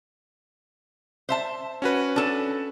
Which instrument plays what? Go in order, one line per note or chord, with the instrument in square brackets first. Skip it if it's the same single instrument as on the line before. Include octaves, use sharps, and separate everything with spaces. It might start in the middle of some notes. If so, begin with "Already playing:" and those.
[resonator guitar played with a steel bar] C5 E5 A5
[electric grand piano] C#4 F#4 B4
[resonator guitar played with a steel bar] D4 A4